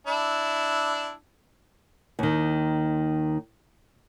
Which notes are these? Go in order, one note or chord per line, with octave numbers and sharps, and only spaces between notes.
D4 E4
D#2 D#3